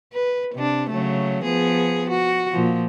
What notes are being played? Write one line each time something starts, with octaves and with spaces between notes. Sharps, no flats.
B4
C3 D4
C#3 F#3 A3
F3 B3 G#4
F#4
A#2 F3